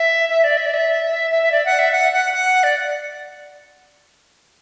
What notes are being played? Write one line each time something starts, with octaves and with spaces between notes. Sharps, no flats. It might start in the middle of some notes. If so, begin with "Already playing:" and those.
Already playing: E5
E5
D5
E5
D5
E5
E5
E5
E5
D5
F#5
E5
F#5
F#5
F#5
D5